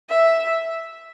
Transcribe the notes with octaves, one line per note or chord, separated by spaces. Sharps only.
E5